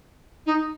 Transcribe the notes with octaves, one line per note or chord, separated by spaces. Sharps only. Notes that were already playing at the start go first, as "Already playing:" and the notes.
D#4